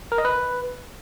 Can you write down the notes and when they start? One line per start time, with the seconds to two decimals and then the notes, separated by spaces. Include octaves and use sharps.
0.12 A#4
0.18 D#5
0.25 B4